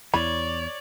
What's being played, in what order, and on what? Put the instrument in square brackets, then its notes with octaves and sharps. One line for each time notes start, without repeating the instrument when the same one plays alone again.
[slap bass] E2 E3 [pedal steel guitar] C#5 [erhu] D5 [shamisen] B5